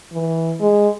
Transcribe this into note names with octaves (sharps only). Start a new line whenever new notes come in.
E3
G#3